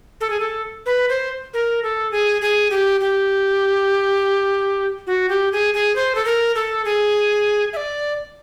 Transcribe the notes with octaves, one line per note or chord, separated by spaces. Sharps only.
A4
G#4
A4
B4
C5
A#4
A4
G#4
G#4
G4
G4
F#4
G4
G#4
G#4
C5
A4
A#4
A4
G#4
E5
D5